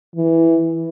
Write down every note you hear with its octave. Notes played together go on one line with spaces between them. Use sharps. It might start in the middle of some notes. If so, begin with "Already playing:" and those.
E3